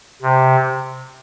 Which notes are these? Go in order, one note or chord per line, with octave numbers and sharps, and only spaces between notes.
C3